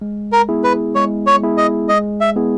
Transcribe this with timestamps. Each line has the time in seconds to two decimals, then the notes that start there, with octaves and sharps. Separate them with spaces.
0.01 G#3
0.32 A#4
0.49 B3 E4 G#4
0.63 B4
0.95 G#3 C#5
1.27 C#5
1.42 B3 E4 G#4
1.57 D#5
1.89 G#3 D#5
2.21 E5
2.36 B3 E4 G#4